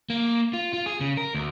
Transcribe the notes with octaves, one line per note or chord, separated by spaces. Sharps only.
A#3
F4
F4
G#4
C#3
A#4
D2